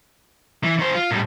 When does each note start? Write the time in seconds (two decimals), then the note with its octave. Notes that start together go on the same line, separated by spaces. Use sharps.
0.64 E3
0.79 D#3 C5
0.95 F4
1.11 A2 G3